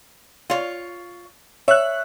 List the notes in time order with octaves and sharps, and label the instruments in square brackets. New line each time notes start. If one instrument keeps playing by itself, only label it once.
[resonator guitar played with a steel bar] F4 C#5
[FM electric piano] C#5 F#6 [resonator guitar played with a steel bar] E5